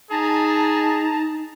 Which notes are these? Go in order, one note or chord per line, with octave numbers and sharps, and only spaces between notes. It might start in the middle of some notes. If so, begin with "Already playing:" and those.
D#4 G#4 A5 A#5